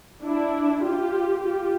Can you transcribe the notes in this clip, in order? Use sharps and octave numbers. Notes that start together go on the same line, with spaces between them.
D4 E4
F4 G4
F4 G4